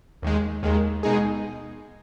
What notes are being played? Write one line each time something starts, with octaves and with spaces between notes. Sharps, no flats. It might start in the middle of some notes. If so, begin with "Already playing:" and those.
D#2 D#3 G#3
D#2 D#3 G#3
B2 G#3 D#4 G#4